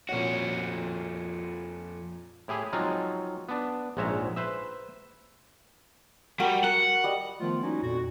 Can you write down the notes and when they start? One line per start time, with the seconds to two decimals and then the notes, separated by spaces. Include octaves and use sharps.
0.09 F2 A#2 F#4 C#5
2.48 A2 E4 G4 G#4
2.73 F3 F#3 G#3 C4 D#4 F4
3.49 B3 D4
3.97 A#1 G#2 G#3 C#5 E5 A#5
4.36 B4 C5 E5
6.39 G3 F#4 A#4 F#5
6.64 A#4 F#5
7.04 G3 D#5
7.40 D#3 F3 A3 B3 F4
7.62 G3 A#3 C#4 D#4 E4 F#4
7.83 F2 A#2 F#4